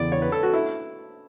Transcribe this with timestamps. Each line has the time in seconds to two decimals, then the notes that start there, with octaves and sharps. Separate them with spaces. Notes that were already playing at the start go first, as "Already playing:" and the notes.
Already playing: E2 C#3 E3 B3 E4 D5
0.12 C#5
0.22 B4
0.32 A4
0.43 F#4
0.54 E4